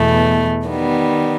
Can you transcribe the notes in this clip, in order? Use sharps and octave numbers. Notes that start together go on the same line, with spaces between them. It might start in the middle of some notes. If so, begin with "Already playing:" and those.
Already playing: E2 B2 A3
D#3 G3 B3